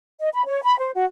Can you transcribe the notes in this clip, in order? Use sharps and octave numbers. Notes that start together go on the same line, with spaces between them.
D#5
B5
C#5
B5
C5
F#4